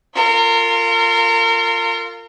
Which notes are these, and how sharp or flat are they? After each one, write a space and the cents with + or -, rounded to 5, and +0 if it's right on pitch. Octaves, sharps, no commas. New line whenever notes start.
F4 +0 A#4 -35